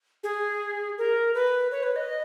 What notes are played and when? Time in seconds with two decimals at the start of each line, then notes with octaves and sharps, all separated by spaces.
0.24 G#4
0.98 A#4
1.34 B4
1.71 C#5
1.83 B4
1.96 D#5